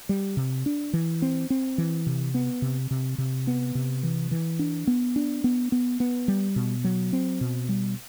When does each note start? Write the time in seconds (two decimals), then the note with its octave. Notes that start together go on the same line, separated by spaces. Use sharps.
0.09 G3
0.37 C3
0.66 D4
0.93 E3
1.22 C4
1.50 C4
1.78 E3
2.06 C3
2.34 B3
2.62 C3
2.91 C3
3.18 C3
3.47 B3
3.75 C3
4.03 E3
4.31 E3
4.59 D4
4.87 B3
5.16 D4
5.44 B3
5.72 B3
6.00 B3
6.28 G3
6.56 B2
6.84 F#3
7.13 C4
7.41 B2
7.69 G3